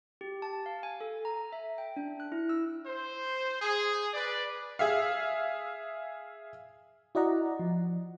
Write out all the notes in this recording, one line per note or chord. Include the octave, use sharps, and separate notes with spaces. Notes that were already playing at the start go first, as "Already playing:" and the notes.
G4
A5
F5
G#5
A4
A#5
E5
G5
D4
F#6
E4
E6
C5
G#4
B4 D5
G#4 E5 F5
E4 F#4 D5 D#5 F#5 A#5
F3